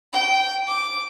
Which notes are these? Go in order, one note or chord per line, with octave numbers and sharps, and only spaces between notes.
G5
D6